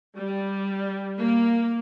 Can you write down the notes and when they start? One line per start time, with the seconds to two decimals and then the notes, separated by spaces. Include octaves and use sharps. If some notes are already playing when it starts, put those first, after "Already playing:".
0.18 G3
1.19 A#3